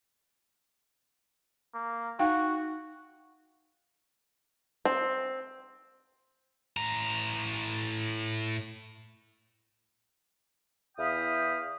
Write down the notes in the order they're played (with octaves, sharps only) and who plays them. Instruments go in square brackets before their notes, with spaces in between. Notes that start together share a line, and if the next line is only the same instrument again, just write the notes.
[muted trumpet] A#3
[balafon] D#4 F5 G5 [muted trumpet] F#4
[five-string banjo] C4
[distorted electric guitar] A2 A#5
[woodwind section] E2 E4 F5 G5 B5 D#6